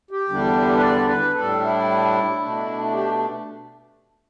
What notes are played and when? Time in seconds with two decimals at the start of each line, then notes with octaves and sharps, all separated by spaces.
0.11 G4
0.29 E2 D3 G3 D4
0.77 B4
0.82 D5
1.08 B4
1.34 A2 G3 D4 A4
1.61 E4
2.40 B2 A3 D4
2.94 G4